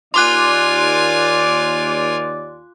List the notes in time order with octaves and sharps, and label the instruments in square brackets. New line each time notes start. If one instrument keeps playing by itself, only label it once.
[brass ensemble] D#2 D5 [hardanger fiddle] F4 G#5 [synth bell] C6 D6 F#6